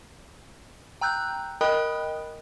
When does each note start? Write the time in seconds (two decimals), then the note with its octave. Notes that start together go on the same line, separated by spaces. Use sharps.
1.01 G5 A#5 E6 F#6 G6
1.61 A#4 D#5 G5 B5 D#6 F#6